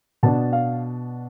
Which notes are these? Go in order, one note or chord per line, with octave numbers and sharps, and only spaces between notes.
B2 B3 D4 A5
F5